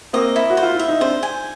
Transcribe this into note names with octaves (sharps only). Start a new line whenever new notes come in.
A#3 C4 D#5
E4
F#4
C5
F4
E4 E5
D#4
C4 D4 C5
G#5